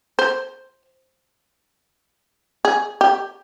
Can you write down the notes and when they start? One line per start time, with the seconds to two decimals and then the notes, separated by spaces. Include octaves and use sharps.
0.19 C5
2.65 G#4
3.01 G4